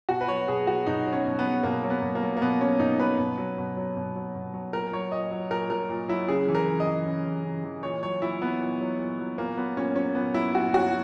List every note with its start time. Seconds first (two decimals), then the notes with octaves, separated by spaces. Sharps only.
0.09 B2 F#4
0.21 B4
0.28 F#3 C#5
0.48 B2 G#4
0.67 F#3 F#4
0.87 B2 D#4
1.07 F#3
1.13 C#4
1.26 B2
1.39 B3
1.45 F#3
1.63 B2 A#3
1.84 F#3
1.90 B3
2.02 B2
2.15 A#3
2.23 F#3
2.37 A#3
2.41 B2 B3
2.61 F#3 C#4
2.80 B2 D#4
3.00 F#3 B4
3.18 B2
3.38 F#3
3.58 B2
3.77 F#3
3.97 B2
4.16 F#3
4.35 B2
4.54 F#3
4.73 A#2 A#4
4.93 F#3 C#5
5.12 A#2 D#5
5.31 F#3
5.50 A#2 A#4
5.70 F#3 A#4
5.89 A#2
6.08 F#3 E4
6.28 C#3 G#4
6.48 E3
6.55 A#4
6.68 C#3
6.80 D#5
6.86 E3
7.05 C#3
7.25 E3
7.44 C#3
7.64 E3
7.83 A#2 C#5
8.03 F#3 C#5
8.21 A#2 E4
8.41 F#3 B3
8.60 A#2
8.81 F#3
8.99 A#2
9.19 F#3
9.38 A#2 A#3
9.57 F#3 B3
9.77 A#2 C#4
9.96 F#3 C#4
10.15 A#2 B3
10.34 F#3 E4
10.55 A#2 F#4
10.74 F#3 F#4